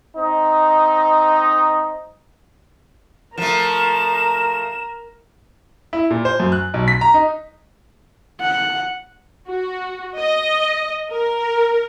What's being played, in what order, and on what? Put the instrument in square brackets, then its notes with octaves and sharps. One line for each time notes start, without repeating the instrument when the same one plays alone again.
[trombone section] C4 D#4
[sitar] F3 A3 [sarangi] A#4 [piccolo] E7
[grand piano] E4
A#2
C5
F#2
F#6
B1
B6
A#5
D#4
[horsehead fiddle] F#5
[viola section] F#4
D#5
A#4